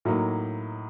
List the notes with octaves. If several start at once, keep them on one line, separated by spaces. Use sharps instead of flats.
A2 F#3 A#3 D#4